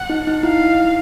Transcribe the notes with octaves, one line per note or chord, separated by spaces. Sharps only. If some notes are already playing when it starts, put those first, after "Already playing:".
Already playing: F#5
D#4
D#4
E4 F5